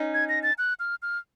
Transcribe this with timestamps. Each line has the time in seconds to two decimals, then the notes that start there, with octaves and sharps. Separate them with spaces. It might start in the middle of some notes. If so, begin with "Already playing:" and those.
Already playing: C#4 D#4
0.14 G#6
0.29 A#6
0.43 A6
0.58 F#6
0.80 F6
1.02 F6